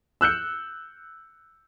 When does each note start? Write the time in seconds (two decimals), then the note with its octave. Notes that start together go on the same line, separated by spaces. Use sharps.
0.21 E6 F#6 G6 C#7